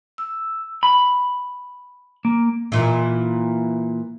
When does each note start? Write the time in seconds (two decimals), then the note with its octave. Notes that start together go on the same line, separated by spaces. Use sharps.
0.18 E6
0.83 B5
2.25 A#3
2.72 A#2 E3